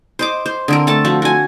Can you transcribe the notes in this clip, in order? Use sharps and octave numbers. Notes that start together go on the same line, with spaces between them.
C5 D#5 D6
C5
D3 C4 A#4
A3 A4 A5
F3 F4 F#4
F#4 G#5